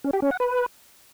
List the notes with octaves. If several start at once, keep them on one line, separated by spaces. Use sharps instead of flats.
C#4
G4
C#4
F#5
B4